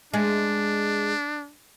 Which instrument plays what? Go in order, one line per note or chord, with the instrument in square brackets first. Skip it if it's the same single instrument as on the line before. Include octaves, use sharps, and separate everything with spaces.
[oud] G#3 [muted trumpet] D4